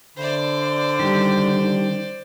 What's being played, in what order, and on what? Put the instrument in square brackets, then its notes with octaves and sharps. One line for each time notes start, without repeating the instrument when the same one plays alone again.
[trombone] D3 [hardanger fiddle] C5 D5 [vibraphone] E5 B5
[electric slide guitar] D#3 [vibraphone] G3 C#4 G4